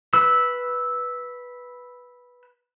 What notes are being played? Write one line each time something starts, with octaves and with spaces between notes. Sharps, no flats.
B4 E6